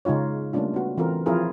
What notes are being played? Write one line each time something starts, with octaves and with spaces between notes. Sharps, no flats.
C#3 G#3 D#4 F4 C#5
G3 A3 A#3 C#4 D4 F4
B3 F#4
E3 C4 F4 A4 A#4
F3 C4 E4 F4 G#4 A#4